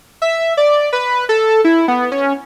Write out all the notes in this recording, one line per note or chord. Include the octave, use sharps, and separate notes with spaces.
E5
D5
B4
A4
E4
B3
C#4